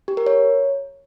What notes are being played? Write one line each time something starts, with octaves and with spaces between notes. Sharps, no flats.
G4
A#4
C#5